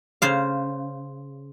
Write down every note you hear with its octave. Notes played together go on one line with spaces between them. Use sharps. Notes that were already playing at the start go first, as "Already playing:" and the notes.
C#3 C5 F5